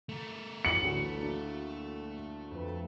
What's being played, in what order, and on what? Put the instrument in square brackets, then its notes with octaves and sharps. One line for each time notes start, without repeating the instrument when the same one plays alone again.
[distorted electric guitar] A3 A#4
[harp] A1 F#4 [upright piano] C#7 F#7
[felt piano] D2 D3
[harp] A#3 D4
F2 B4